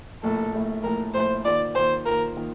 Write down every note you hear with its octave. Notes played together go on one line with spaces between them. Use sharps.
A#1 A2 A3 A4
A#1 A2 A3
A#1 A2 A3 A#4
A#1 A2 A3 C5
D#3 A#3 F4 D5
D#3 A#3 F4 C5
D#3 A#3 F4 A#4
D#3 A#3 F4